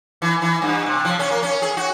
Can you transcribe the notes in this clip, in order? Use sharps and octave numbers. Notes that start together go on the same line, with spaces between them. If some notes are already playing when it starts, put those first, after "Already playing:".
E3
E3
G2
C3
F3
C#4
A#3
C#4
G#4
F#4